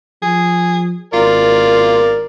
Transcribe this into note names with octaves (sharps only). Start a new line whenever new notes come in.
F3 G#4
G#1 F4 A#4 D5